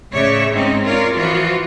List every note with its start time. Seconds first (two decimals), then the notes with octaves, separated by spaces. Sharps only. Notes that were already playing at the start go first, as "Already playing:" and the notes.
0.12 A2 C#3 C#5 D5 E5
0.53 G#2 C4 C#4 D#4
0.84 F4 A#4 C#5 D5
1.16 E3 F3 F4 F#4